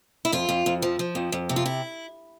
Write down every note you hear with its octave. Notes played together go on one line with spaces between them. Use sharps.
E4
F2 F4
F2
F2
F3
F3
F2
F2
C3
F4
E4